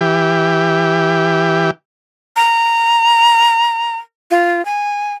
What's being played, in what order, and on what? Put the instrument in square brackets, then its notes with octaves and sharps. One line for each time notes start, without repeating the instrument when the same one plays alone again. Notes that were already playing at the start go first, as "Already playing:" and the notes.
[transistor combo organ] E3 G4
[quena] A#5
F4
G#5